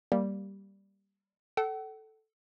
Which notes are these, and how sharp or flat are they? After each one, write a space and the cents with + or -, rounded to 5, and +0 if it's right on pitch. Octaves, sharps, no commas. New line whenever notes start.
G3 +0 A#3 +0
A4 -5 F#5 +45